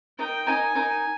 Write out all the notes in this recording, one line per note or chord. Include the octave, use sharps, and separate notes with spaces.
D#4 A#4 D#5 G5 A#5
D#4 A#4 D#5 G#5 A#5
D#4 A#4 D#5 A#5